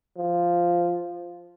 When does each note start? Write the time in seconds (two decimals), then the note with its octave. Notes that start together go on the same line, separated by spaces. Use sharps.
0.17 F3